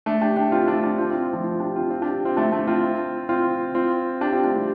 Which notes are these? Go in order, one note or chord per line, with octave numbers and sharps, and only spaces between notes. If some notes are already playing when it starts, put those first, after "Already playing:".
A3 D4
D4 G4
D4 G4
C4 F4
A3 D4
D4 G4
C4 F4
C4 F4
F3 A3
C4 F4
D4 G4
C4 F4
C4 F4
D4 G4
C4 F4
A3 D4
A3 D4
C4 F4
C4 F4
C4 F4
D4 G4
C4 F4
A3 D4
G3 C4